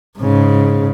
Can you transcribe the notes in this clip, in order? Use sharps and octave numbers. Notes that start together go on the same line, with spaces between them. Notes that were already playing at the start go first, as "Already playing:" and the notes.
G#2 C#3